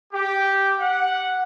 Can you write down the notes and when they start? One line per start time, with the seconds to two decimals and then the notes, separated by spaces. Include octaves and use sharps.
0.13 G4
0.80 F#5